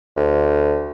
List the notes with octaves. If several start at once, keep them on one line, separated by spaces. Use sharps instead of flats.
D2